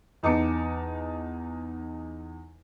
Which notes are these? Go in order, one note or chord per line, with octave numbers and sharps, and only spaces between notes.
E2 D#4 A5 D6 C#7